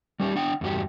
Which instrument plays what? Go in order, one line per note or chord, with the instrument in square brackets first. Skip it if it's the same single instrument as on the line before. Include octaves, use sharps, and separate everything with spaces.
[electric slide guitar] G3 C#4 G4
D4 F#5 G5
E2 G2 F#4 G4